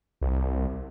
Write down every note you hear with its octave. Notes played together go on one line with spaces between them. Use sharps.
C2